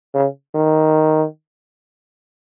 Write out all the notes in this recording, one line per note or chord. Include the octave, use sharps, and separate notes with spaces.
C#3
D#3